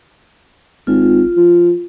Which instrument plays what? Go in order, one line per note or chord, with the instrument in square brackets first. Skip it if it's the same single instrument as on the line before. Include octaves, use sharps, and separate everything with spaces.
[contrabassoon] G#1 [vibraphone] F4
[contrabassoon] F3